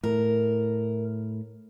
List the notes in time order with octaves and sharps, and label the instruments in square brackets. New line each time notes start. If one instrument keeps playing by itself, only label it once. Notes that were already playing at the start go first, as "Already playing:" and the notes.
[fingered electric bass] A2 [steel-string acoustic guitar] A#4